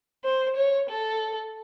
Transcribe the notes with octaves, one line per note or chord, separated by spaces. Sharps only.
C5
C#5
A4